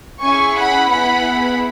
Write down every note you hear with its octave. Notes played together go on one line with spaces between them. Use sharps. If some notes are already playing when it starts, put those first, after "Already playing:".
C#4 E4 G#4 G#5 C#6
F#5 B5
B3 E4 G#4 F#5 B5